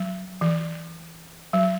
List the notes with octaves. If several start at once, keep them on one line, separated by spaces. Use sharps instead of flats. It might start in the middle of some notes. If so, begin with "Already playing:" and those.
Already playing: F#3
E3
F#3